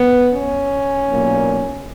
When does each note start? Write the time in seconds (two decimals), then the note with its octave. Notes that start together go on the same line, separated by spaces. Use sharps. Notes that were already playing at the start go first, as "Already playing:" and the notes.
Already playing: B3
0.31 C#4
1.06 B1 A#2 A#3